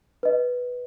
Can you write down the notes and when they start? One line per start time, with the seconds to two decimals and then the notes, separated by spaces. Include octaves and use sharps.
0.23 B4 D#5